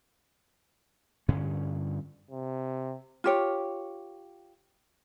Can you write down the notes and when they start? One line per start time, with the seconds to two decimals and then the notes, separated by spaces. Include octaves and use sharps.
1.28 G2 D3 C#4
2.31 C3
3.24 F4 G4 C#5